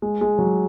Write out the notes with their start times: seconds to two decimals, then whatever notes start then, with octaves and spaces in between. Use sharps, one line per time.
0.02 G#3
0.21 G#3
0.39 F#3